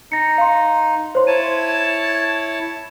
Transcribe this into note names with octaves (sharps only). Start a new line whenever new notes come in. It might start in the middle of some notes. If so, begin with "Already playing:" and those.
D#4 A#6 C#7
F5 C6
C5 C#5 C6
E4 C#5 A5 D#7